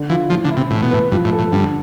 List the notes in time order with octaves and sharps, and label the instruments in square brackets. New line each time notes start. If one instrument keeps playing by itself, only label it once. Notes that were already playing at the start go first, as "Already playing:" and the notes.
Already playing: [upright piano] D3 D5
[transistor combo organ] E3 [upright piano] F4
[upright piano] A2 [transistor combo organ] F3
[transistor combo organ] D3
[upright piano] E4
[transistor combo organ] C3
[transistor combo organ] A2 [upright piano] E3
[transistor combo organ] B2
[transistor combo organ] A2 [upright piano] B4
[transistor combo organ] G2 [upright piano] F3
[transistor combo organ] A2
[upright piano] A4
[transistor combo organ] A2
[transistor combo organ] G2 [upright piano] D3